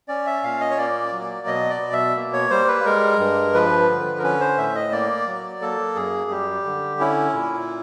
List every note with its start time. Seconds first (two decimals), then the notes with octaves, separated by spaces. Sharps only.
0.08 C#4 D5
0.26 E5
0.43 A#2 F5
0.61 D#5
0.70 C#5
0.77 A#3 D5
1.12 F#3
1.47 B2 D#5
1.70 D5
1.82 B2
1.93 E5
2.16 A#3
2.33 C#5
2.50 G3 C5
2.68 B4
2.85 G#3 A#4
3.20 G2
3.54 F3 B4
3.89 D3
4.18 A#4
4.23 C#4 B4
4.41 C5
4.58 A2 E5
4.75 D#5
4.92 A#3 D5
5.27 F#3
5.61 A#3 A4
5.96 F#2 G#4
6.30 G3 G4
6.65 D3
7.00 C#4 E4
7.34 A#2